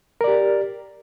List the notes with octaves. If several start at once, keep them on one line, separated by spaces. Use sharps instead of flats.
G4 A#4 D5